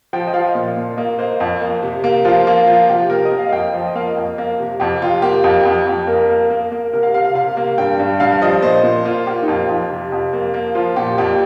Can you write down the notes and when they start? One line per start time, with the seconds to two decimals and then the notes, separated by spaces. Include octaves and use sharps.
0.13 F3 G5
0.27 D#5
0.34 F3 F5
0.55 A#2
0.77 A#2
0.97 A#3 D#5
1.19 A#3 C5
1.40 F2
1.62 A#3
1.83 C3
2.04 A#3
2.25 F3 F4
2.47 A#3
2.67 F3 F4
2.89 C3 G4
3.10 A#3 A#4
3.25 D#5
3.32 A#3
3.39 F5
3.49 F5
3.52 F2 G5
3.74 F3
3.86 D#5
3.95 A#3 F5
4.17 F2
4.38 A#3
4.60 C3
4.80 F2 G4
5.02 C3 F4
5.22 A#3 G4
5.44 F2
5.65 F2
5.87 F2
6.07 A#3 A#4
6.30 A#3
6.50 A#3
6.72 A#3
6.93 C3 A#4
7.03 F5
7.14 C3 F5
7.25 F5
7.35 C3 F5
7.57 A#3
7.78 G2 G5
8.00 G2
8.20 G2 F5
8.41 F3 D#5
8.63 A#2 C5
8.84 A#2
9.05 A#3 F4
9.27 A#3 G4
9.42 D#4
9.48 F2 F4
9.69 F2 F4
9.90 C3
10.12 F2
10.33 A#3
10.54 A#3
10.75 F3 F4
10.96 A#2 G4
11.18 F2 G4